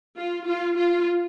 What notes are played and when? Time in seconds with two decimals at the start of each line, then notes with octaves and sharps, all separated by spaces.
0.17 F4
0.47 F4
0.77 F4